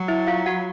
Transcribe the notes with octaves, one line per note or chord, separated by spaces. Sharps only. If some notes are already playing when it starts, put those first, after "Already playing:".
Already playing: F#3
E4 E5
F4 F5
F#4 F#5